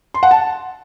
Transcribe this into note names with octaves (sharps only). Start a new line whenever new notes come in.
C6
F#5
A5